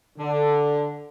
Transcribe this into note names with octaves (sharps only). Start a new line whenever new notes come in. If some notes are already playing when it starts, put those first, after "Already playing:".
D3